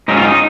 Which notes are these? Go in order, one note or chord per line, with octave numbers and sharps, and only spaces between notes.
G#2 F#3 C#4 D#4
F4
D#4